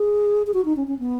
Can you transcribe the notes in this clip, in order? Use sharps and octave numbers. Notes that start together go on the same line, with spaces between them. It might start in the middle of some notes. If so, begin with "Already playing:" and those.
Already playing: G#4
G#4
F#4
D#4
C#4
C#4
B3